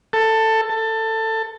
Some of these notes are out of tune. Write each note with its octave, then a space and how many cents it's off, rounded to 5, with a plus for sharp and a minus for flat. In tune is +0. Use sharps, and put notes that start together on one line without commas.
A4 +15
A4 +20